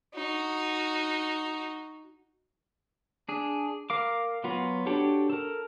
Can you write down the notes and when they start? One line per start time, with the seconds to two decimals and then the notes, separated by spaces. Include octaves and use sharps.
0.15 D#4 F#4
3.29 D4 G#4
3.90 A#4 F5 D6
4.44 F#3 B3 F4
4.86 D4 F#4 G4 A4 C#5
5.30 A4 A#4